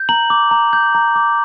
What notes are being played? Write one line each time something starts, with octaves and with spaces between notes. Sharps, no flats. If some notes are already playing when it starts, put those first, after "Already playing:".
Already playing: G6
A#5 F#7
D6
A#5
G6
A#5
D6